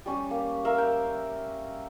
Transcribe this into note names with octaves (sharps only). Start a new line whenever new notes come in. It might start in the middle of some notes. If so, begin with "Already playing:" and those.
G3 C#4 G4
A#3
A#4 E5 F5
G5